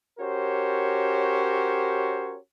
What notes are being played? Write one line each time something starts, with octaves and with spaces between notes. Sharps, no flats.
C#4 F#4 G4 A#4 C5 C#5